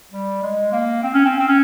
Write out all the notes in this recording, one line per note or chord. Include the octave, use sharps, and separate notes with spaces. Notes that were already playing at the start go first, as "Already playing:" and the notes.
G3
G#3
A#3
C4
C#4
C4
C4
C#4